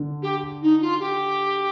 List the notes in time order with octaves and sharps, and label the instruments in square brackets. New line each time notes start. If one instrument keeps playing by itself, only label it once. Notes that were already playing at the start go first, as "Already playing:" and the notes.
Already playing: [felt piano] D3
[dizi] G4
D#4
F4
G4